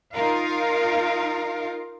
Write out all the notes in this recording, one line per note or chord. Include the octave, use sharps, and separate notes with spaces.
D#4 F4 A#4 F5